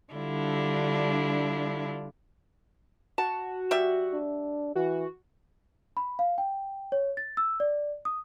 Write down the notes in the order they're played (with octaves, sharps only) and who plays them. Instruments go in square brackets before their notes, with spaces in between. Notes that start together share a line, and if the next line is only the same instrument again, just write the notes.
[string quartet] D3 G3 D4 E4 F4
[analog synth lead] F#4 [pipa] A5
[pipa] G3 E5
[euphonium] D4
[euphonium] E3 [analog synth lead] F#4
[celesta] B5
F5
G5
C#5
A6
E6
D5
D#6